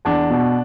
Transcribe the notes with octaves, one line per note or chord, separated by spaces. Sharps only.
E2 D4
B2